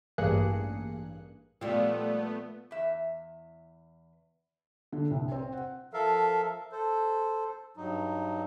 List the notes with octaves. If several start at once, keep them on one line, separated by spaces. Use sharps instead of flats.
A1 G2 A#3 G#4 F#6 C#7
A#2 F3 G3 A3 B3 C4 E5
E2 E5
D3
C2
C4
F#5
F3 A4 A#4 E5 F5
A4 C5
G2 F#3 D#4